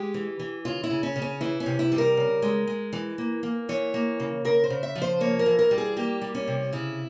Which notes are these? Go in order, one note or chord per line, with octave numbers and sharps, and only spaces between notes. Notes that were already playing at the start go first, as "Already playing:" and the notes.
Already playing: G#3 G4
E3
E3
C#3 F4
E4
C#3
C#4
C#3
C#4
E3 E4
C#4
C3
E4
G3
A#4
C#3
G#3
G#3
E3
A#3
A#3
E3 C#5
A#3
C#3
C#3 A#4
C5
C#3
E5
F3
C5
A#3 C#5
A#4
E3
A#4
G3
G#4
A#3 G4
G3
C#4
C3
C#3 E4